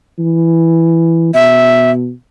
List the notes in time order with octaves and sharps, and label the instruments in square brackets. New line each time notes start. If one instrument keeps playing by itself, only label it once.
[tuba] E3
[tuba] B2 [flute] E5